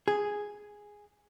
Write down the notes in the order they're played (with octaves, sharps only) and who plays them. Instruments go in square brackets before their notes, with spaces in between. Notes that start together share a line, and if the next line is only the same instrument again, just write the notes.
[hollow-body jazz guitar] G#4